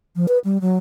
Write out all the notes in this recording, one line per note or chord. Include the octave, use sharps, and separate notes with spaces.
F3
B4
G3
F#3